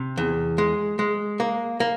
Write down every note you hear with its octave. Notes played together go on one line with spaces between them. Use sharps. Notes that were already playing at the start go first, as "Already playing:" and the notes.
Already playing: C3
E2
G#3
G#3
A#3
A#3